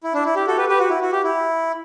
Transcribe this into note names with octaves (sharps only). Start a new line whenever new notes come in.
E4
D4
E4
G4
F#4 A4
G4 B4
G4 B4
F#4
E4
F#4
G4
E4